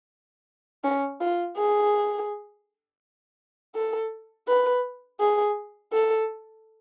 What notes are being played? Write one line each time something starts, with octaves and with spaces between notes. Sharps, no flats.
C#4
F4
G#4
A4
B4
G#4
A4